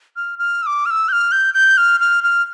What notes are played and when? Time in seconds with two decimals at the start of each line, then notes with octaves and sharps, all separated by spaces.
0.16 F6
0.39 F6
0.62 E6
0.66 D6
0.86 F6
0.91 E6
1.08 G6
1.12 F6
1.32 G6
1.54 G6
1.77 F6
2.00 F6
2.24 F6